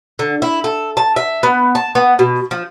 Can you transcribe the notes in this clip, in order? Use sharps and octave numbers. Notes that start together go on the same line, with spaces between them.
D3
E4
A4
A5
E5
B3
A5
B3
B2
F3